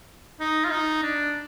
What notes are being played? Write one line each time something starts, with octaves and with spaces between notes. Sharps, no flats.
D#4
F4
D#4
D4